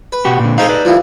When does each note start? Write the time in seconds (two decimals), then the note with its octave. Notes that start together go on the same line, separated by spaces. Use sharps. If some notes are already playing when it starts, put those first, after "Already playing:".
0.12 B4
0.25 B2 F#4 G4
0.39 A#2 D3
0.58 A3 D#4 G#4 A4 C5 F5
0.69 B4 D5
0.85 C2 E3 F3